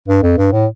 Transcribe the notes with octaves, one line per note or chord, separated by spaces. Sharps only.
G2
F2
G2
A2